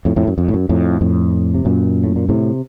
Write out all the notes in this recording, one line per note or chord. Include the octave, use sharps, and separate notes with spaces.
F2 A2
F2 A2
F#2
F2
A2
F#2
F2 A2
F2 A2
C3
F#2 A#2
A2
A#2
A2 C3